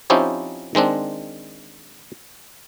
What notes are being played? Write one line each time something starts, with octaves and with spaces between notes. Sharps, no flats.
F3 C4 C#4 D#4 E4 G4
D#3 G#3 C4 D4